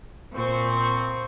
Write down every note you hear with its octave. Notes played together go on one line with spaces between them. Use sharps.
A#2 C4 C#6